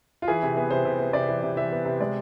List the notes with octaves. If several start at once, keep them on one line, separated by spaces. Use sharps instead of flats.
F4
E3 G#4
C3
B3 G#4
C3 C5
C3
B3
C3 D5
E3
C3
E3 E5
B3
C3
G#3 D5